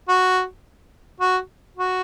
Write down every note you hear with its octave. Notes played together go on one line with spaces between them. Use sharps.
F#4
F#4
F#4